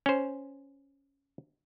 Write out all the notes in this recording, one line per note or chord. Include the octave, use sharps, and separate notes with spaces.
C#4 C5